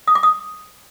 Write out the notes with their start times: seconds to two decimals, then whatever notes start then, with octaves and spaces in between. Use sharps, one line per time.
0.07 D#6
0.15 D6
0.23 D#6